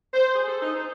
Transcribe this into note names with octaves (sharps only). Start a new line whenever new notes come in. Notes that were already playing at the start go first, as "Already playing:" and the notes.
C5
G#4
A4
D#4
C5